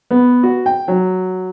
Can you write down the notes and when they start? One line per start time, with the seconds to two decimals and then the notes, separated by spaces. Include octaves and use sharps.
0.11 B3
0.43 F#4
0.66 G5
0.88 F#3